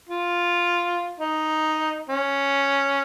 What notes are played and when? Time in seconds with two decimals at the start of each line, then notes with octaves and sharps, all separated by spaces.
0.09 F4
1.20 D#4
2.10 C#4